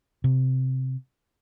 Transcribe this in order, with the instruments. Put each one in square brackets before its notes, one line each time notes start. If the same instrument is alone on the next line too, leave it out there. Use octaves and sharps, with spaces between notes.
[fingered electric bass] C3